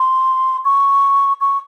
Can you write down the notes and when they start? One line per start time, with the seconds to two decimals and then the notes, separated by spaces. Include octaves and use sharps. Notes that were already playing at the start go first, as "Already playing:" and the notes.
Already playing: C6
0.65 C#6
1.41 C#6